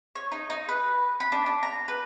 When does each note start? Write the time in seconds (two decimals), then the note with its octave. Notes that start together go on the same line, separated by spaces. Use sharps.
0.15 C#5
0.32 D#4
0.50 D#4
0.69 B4
1.20 B5
1.32 D4
1.46 D4
1.63 A#5
1.88 B4